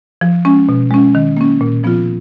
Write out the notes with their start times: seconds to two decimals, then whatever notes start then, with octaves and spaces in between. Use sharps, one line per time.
0.21 F3
0.45 G#3 C#4
0.69 B2
0.90 G#3 C#4
1.15 D#3
1.37 A#3 C#4
1.61 A#2
1.84 F3 B3 F4